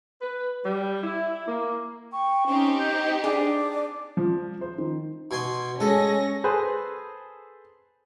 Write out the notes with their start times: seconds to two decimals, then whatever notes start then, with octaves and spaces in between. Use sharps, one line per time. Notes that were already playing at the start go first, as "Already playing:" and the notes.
0.22 B4
0.65 G3
1.03 E4
1.48 A#3
2.13 G5 C#6
2.47 C4 C#4 D#4 G4
2.80 D#5 G6
3.24 D4 G#4 D5 D6
4.17 F3
4.61 C5
4.78 D#3
5.31 B2 G#5 C6
5.80 G#3 C#4 A4 A#6
6.44 G#4 A4 B4 C5 G#5